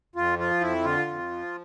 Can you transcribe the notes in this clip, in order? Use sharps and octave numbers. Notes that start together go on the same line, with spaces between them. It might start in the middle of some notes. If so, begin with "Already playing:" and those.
F2 F4
F3 F4
F2 E4
D3 F4
F2
F3